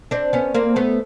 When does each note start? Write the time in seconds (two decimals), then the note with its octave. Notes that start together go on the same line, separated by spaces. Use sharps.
0.11 C4 D4
0.33 B3 C#4
0.54 A#3 C4
0.76 A3 B3